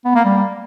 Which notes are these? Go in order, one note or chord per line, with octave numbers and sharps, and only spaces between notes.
B3
A#3
G3